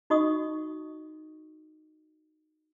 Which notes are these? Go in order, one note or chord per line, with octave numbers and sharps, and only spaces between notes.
D#4 F#4 D#5 C#6 D#6